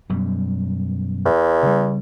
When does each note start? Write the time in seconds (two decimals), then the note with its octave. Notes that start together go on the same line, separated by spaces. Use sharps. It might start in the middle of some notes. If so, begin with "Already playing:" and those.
0.10 F#2 B2 G3
1.25 E2
1.63 C#3 G3